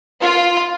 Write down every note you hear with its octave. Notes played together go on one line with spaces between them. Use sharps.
F4